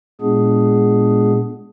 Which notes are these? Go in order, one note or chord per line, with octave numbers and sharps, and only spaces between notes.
A#2 G#3 B3 D4 G#4